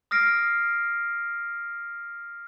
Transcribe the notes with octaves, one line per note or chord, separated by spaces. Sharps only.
D#6 F6 A#6 C7 D7